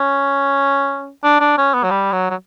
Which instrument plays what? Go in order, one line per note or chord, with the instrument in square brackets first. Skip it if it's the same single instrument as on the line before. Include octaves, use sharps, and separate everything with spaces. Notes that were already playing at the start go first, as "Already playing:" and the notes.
Already playing: [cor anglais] C#4
D4
D4
C#4
B3
F#3
G3
F#3
F#3